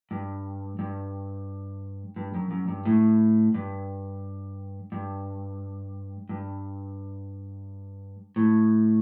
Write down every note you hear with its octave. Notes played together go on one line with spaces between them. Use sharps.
G2
G2
G2
F#2
F#2
G2
A2
G2
G2
G2
A2